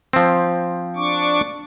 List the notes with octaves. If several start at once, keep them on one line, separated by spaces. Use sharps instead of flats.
F3 C4
D4 C#6 D6